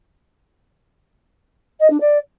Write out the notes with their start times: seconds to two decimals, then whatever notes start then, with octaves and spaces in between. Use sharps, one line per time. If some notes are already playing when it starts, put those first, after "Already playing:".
1.80 D#5
1.90 D4
2.00 D5